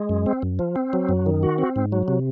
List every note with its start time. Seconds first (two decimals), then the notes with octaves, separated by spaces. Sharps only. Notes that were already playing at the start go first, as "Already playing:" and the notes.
Already playing: G#3
0.09 F#2
0.26 C4
0.42 F#2
0.59 F3
0.76 C4
0.93 F#3
1.09 F#2
1.26 D#3
1.43 F#4
1.58 C4
1.76 G#2
1.92 F#3
2.08 C3